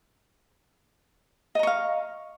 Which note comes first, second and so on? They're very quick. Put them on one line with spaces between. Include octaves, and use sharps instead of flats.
D#5 A#5 C#6 F5